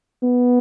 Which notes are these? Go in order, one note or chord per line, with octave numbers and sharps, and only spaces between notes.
B3